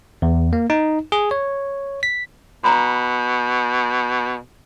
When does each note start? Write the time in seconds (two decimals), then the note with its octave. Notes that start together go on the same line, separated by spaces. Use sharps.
0.22 E2
0.53 A#3
0.70 D#4
1.12 G#4
1.31 C#5
2.03 B6
2.64 B2 A#5 B5